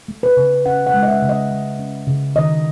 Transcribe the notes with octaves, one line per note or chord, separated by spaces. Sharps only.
A3
B4
C#3
C#4 F#5
F#5
G#3
D#5
E5
C#3
D#5
G#3
C#4
C#3
D#3 D#5